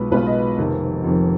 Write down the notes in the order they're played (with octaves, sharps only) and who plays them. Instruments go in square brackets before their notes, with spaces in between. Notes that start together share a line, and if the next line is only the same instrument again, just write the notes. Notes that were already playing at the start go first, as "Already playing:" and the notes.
Already playing: [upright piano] B1 B2 G#3 B3 F4 B4
B1 B2 G#3 B3 F4 B4
D#5
F1 F2 D#3
F1 F2 D#3